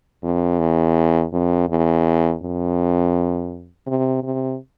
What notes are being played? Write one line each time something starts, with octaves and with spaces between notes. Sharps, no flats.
F2
E2
F2
E2
F2
C3
C3